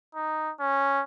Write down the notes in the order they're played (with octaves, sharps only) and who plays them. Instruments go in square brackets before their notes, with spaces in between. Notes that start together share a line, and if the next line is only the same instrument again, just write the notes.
[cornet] D#4
C#4